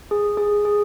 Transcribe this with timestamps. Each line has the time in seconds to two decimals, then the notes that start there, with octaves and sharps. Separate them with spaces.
0.11 G#4
0.37 G#4
0.65 G#4